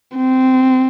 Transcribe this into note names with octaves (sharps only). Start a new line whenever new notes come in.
C4